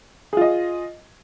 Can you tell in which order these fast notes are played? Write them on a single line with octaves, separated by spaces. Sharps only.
G#4 F4 D#5